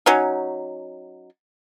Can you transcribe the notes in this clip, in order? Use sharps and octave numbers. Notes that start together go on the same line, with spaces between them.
F#3 C#4 D#4